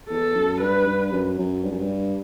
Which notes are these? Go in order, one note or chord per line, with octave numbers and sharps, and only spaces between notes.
E2 A4
F#2
G2 B4
G2
F#2
F#2
G2
F#2
G2